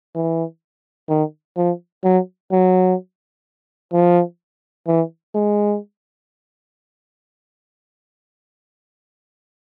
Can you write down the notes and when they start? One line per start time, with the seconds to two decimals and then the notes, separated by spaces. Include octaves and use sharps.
0.15 E3
1.09 D#3
1.57 F3
2.04 F#3
2.52 F#3
3.93 F3
4.87 E3
5.34 G#3